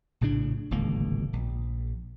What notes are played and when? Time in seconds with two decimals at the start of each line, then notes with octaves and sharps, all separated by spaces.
0.21 A#1 A2 C#3 D4
0.71 D1 G#1 C#2 A#3
1.33 A#1